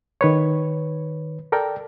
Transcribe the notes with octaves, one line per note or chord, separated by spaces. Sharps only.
D#3 B4 C#5
A4 A#4 D5 G5